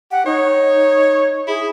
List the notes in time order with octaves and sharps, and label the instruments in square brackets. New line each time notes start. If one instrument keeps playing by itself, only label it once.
[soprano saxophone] G4 [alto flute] F#5
[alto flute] D#4 [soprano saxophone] C#5
[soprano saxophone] E4 [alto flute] G#4